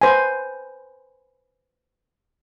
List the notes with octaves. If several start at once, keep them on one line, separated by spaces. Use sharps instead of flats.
B4 C5 G#5